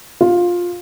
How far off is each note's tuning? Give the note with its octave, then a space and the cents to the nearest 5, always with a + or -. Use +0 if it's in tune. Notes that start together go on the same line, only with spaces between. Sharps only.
F4 +10